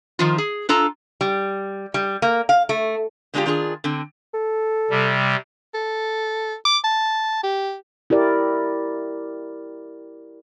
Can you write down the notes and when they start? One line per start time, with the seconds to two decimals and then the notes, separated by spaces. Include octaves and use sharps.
0.19 D#3 F3 F4
0.38 G#4
0.69 D4 F4 A4 A#5
1.21 G3
1.94 G3
2.22 A#3
2.49 F5
2.69 A3
3.34 D3 G#3 D4 D#4 F4 G4
3.46 D#3 D4 F4 F#4 G#4
3.84 D3 C4
4.34 A4
4.90 C3 G3
5.74 A4
6.65 D6
6.84 A5
7.43 G4
8.10 E4 G4 A#4 D5